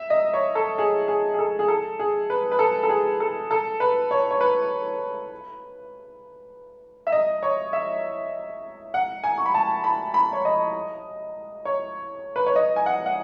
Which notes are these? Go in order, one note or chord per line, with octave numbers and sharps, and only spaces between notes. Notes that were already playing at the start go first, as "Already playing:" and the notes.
Already playing: E5
D#5
C#5
A4
G#4
G#4
G#4
A4
G#4
A4
G#4
B4
B4
A4
A4
G#4
A4
A4
B4
C#5
C#5
B4
E5
D#5
C#5
E5
F#5
G#5
C#6
B5
A5
B5
B5
C#5
D#5
C#5
B4
C#5
D#5
G#5
F#5
F#5